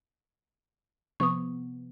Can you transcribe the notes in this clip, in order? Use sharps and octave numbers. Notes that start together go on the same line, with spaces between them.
C3 F3 B3 C#6 D#6